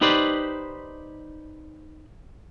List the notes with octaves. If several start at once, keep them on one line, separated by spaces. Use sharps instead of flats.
D#4 G4 B4 C5 D5